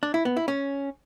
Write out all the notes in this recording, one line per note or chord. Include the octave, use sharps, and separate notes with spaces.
D4
E4
B3
E4
C#4